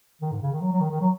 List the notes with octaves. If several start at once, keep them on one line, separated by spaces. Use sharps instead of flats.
D#3
G#2
C#3
D#3
F#3
F#3
D#3
D#3
F#3